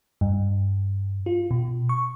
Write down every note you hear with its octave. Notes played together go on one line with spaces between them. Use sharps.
G2
F4
B2
C#6